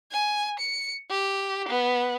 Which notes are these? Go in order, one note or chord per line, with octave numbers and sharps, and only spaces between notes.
G#5
C#7
G4
B3